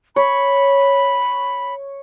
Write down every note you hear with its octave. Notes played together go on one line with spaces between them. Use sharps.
C#5 B5